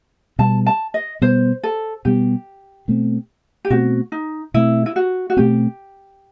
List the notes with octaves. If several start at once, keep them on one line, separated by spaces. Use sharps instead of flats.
B2 G3 B3 A5
A5
D#5
B2 G3 B3 C5
A4
B2 G3 B3 G4
B2 A3 C4
G4
B2 A3 C4 F#4
D#4
B2 A3 C4 E4
E4
F#4
F#4
B2 A3 C4 G4